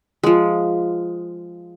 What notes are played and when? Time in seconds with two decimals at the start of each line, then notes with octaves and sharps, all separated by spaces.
0.23 F3 G#3